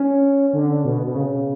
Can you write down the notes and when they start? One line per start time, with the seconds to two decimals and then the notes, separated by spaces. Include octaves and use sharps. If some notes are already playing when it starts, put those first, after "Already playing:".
Already playing: C#4
0.53 D3
0.85 B2
1.07 B2
1.16 C#3